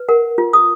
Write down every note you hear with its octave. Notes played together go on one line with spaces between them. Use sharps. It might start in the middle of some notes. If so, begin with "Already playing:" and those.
Already playing: B4
A#4 F#5
F4
D#6